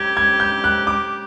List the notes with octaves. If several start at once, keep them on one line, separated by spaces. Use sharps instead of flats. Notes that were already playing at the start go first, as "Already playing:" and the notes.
Already playing: G4 G#6
G#6
G6
F#6
D6